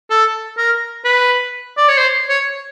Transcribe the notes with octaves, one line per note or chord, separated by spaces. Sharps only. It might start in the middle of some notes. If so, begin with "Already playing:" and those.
A4
A#4
B4
D5
C#5
C5
C#5